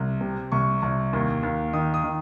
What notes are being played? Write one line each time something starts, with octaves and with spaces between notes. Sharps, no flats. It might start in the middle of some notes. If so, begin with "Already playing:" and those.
Already playing: C2
C3
C2 C#6
C2
D#2
D#2
D#3 D#6
D#6
D#3